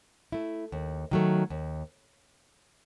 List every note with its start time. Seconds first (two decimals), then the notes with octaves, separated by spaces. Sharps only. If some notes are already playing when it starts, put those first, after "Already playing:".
0.32 A3 E4
0.72 D#2
1.11 D#3 F#3 A3
1.50 D#2